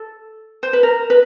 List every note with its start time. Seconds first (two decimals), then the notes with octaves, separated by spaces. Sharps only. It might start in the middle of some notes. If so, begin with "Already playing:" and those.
Already playing: A4
0.63 C5
0.73 B4
0.83 A#4
1.10 B4